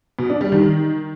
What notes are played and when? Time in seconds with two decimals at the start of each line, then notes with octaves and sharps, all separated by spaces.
0.19 B2
0.30 D4
0.41 G3
0.52 D#3